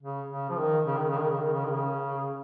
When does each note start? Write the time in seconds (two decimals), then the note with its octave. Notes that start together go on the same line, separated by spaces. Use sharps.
0.03 C#3
0.31 C#3
0.49 F3
0.59 D#3
0.87 C#3
0.98 D#3
1.09 C#3
1.20 D#3
1.31 C#3
1.42 D#3
1.53 C#3
1.66 D#3
1.71 C#3